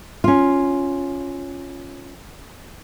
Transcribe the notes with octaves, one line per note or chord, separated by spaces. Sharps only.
C#4 F4